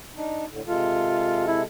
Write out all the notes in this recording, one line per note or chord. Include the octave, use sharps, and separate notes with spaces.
D4 D#4
A2 D3
C3 G#3 F4 A4
E4